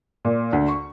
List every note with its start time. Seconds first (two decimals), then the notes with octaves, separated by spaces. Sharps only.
0.25 A#2
0.53 D2
0.68 C#6